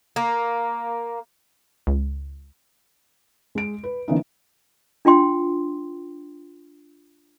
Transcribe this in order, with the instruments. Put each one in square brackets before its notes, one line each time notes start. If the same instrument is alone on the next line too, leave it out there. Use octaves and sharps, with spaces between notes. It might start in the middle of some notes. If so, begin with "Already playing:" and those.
[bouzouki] A#3
[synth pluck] C#2
[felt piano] G#3 D7
B4
D3 E3 A#3 B3 C#4 D#4
[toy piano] D4 F4 G5 C6